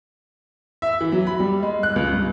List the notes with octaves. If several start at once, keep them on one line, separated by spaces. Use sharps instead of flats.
E5
E3
F#3
B5
G3
G#3
F#6
C#2
G2